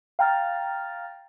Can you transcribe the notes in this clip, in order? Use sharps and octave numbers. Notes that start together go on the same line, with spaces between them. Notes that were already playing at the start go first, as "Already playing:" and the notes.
F5 G5 A#5 F6 A6